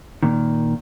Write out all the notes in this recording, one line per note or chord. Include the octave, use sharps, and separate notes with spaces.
A#2 D#3